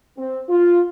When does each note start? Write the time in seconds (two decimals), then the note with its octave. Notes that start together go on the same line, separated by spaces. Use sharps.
0.18 C4
0.49 F4